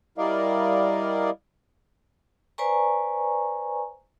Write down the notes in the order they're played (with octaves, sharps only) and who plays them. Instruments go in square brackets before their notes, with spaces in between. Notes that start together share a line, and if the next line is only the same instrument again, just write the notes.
[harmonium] G3 E4 A#4 D5 D#5 F5
[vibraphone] B4 C5 D5 G#5 A#5 C#6